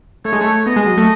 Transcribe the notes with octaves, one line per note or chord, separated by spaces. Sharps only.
A3 C#5
G#3
A3
B3 D#5
G#3
F#3
A3